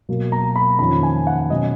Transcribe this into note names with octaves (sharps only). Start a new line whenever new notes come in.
B2 F#3 A#3
A#5
B5
F2 D#3 A#3 C#4 B5
G#5
F#5
B2 F#3 C#4 D#5